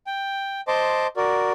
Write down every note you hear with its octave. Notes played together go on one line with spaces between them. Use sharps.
G5
C5 D#5 A5 C6 D6
F#4 A#4 D5